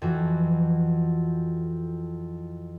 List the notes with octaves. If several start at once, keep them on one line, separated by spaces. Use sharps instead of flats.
F2 E3 F#4